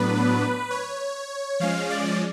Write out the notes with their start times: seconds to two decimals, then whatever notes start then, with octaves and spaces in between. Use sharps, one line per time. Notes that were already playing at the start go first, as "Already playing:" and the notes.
Already playing: A2 F#3 B3 D4 B4
0.70 C#5
1.60 F3 G#3 C#4 F5
1.90 D5